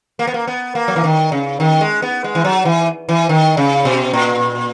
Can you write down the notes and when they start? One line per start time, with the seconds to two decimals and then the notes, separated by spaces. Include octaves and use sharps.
0.19 A#3
0.27 B3
0.34 A#3
0.47 B3
0.75 A#3
0.88 F#3
0.96 E3
1.04 D#3
1.32 C#3
1.60 D#3
1.81 G#3
2.02 B3
2.24 G#3
2.35 E3
2.44 F#3
2.65 E3
3.09 E3
3.29 D#3
3.57 C#3
3.85 B2
4.13 A#2